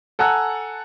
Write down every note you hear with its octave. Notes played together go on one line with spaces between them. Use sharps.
A4 F#5 G#5 A#5 E6 F#6